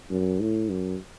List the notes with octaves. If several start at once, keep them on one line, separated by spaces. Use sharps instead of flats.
F#2
A2
F#2